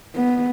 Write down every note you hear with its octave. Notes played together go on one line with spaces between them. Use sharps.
B3